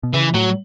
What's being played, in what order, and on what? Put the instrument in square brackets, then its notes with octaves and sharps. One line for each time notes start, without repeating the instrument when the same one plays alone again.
[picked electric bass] B2
[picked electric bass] C#3 [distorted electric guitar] E3
[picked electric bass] A2 [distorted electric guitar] F#3